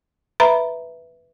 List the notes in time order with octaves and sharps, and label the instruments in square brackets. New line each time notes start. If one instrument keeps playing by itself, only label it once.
[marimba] B4 E5 A#5 B5